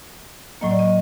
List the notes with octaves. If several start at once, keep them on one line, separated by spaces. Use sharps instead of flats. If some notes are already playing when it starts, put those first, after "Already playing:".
A2 F#3 A#3 D#5
D5
D#5